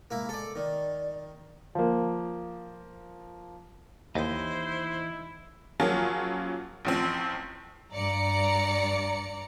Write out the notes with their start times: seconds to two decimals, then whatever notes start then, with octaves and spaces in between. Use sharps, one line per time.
0.11 G#3 A#3 E4
0.29 A4 D5
0.56 D#3 D5
1.75 F3 A#3
4.15 D#2 E3 D#4 E4 C5 D#5
5.80 F3 F#3 A#3 C#4 F4 G#4
6.85 A1 F3 C4
7.94 G2 D5 A#5 C#7